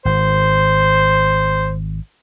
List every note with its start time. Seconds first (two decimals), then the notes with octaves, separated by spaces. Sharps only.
0.05 G#1 C5